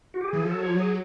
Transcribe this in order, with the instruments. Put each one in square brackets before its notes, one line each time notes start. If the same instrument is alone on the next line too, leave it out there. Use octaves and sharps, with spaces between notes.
[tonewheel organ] F#4
G4
[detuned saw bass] E3 [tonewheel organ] G#4
[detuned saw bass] F3 [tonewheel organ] A4
[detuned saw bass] F#3
[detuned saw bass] F3 [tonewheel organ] C#5
[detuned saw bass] F#3
[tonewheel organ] G#4